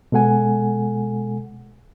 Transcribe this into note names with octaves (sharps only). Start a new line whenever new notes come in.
B2 G#3 A4 F#5 G#5